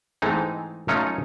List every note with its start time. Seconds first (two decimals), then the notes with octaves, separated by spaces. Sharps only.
0.22 G#2 E3 G#3 A3 C4 D#4
0.88 F#3 A3 C#4 D#4 F4 C#5